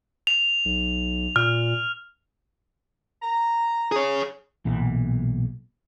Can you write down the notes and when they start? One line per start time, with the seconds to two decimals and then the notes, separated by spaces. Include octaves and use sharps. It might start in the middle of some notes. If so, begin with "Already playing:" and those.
0.27 F7
0.65 B1
1.36 A#2 F6
3.22 A#5
3.92 G#4 C#5
4.65 B1 A#2 E3